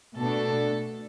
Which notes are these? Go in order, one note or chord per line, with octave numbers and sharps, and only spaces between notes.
B2 A3 D4 A4